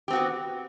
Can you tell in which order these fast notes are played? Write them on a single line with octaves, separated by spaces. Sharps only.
G4 C4 F#4 B3